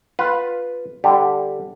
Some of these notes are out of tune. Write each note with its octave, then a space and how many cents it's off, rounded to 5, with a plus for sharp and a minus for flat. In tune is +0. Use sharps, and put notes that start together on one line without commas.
F4 +5 B4 +0 F5 +0
D3 +0 G3 +0 G4 +0